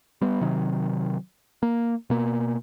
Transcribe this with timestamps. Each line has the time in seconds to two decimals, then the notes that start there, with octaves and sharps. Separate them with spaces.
0.21 G3 B3
0.41 C3 D#3 F#3
1.63 A#3
2.10 B2 A#3